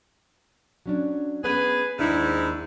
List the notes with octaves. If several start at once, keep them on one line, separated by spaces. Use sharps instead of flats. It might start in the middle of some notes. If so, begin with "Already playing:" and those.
F#3 C#4 D4
B3 C#4 G#4 B4
D#2 G#2 D4 E4